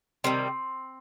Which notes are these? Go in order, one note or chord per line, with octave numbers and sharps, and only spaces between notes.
C3 D#3 G3 C4